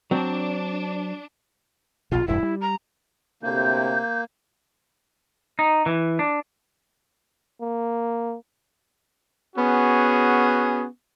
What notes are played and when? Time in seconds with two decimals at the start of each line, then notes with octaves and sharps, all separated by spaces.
0.11 F#3 C4 D4
2.12 A#1 B2 F4
2.28 E1 G2 E4
2.43 G3
2.61 A#5
3.43 D2 A2 C3 A#3 G6
5.59 D#4
5.86 E3
6.19 D4
7.61 A#3
9.56 B3 C#4 F#4 G#4